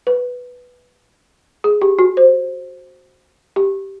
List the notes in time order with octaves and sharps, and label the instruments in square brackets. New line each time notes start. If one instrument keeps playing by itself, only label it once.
[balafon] B4
G#4
G4
F#4
C5
G4